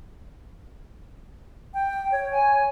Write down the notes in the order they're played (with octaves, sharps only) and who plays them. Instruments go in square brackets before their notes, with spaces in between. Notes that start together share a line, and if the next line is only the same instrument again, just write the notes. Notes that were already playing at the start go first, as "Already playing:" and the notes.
[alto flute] G5
C#5
[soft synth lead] G#5